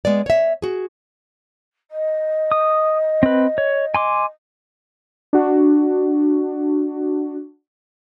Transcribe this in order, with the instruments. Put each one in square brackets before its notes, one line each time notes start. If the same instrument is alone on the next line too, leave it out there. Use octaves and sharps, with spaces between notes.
[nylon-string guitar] G#3 B3 D5
C#5 E5
F#4 G#4
[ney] D#5
[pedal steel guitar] D#6
C4 B4
C#5
G#5 C6 D6
[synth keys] D4 F#4